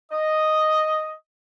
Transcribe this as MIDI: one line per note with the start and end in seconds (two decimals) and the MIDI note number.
0.11 1.11 75